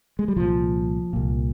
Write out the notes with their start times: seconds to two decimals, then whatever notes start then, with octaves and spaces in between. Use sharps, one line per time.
0.19 G#3
0.28 G3
0.36 C2 A#2 F3
1.13 C2 A#2